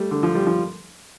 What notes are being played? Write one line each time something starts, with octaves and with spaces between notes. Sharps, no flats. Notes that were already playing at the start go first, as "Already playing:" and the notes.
Already playing: G3 A3
D3
F3
G3
F3